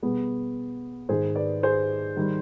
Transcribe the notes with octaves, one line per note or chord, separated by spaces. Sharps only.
B2 G3 B3 G#4
G#2 D#3 G#3 G#4 C5
B4 D5
G#4 C5
D#3 G3